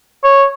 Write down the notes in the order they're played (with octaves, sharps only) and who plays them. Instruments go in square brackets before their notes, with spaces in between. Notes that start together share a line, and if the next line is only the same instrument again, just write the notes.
[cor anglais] C#5